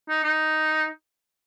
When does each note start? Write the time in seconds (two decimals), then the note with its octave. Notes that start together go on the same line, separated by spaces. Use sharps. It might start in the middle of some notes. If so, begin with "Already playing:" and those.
0.09 D#4
0.24 D#4